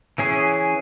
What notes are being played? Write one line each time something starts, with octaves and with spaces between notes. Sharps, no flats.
E3 C#4 G#4